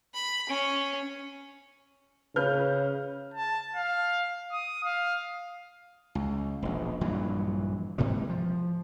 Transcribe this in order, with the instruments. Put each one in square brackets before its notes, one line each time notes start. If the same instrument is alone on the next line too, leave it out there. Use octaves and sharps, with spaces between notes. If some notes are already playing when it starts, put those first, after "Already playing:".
[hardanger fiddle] B5
C#4
[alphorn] C#3 [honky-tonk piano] B4 F6 G6
[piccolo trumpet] A5
F5
D#6
F5
[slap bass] C#2
E1 A#1
A#1 G2 E3 F#3
G#2 C3 E3 G3
F3